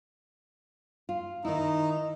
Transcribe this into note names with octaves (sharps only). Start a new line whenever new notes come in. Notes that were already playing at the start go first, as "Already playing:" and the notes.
F4
D#3 D#4 E4